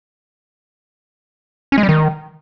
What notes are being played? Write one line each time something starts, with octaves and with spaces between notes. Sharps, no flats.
C#4
G#3
G3
D#3